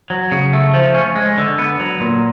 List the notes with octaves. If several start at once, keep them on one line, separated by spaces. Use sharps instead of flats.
F#3
C#3
A3
F3
C#4
G#3
D3
B3
F#3
A#2